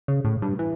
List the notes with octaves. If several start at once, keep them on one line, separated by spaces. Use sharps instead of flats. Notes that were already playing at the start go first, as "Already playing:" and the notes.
C#3
A2
G2
E3